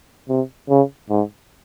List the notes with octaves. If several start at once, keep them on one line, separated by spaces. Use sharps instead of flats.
C3
C#3
G#2